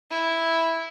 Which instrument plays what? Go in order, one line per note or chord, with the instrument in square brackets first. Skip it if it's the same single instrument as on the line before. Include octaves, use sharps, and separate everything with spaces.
[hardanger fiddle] E4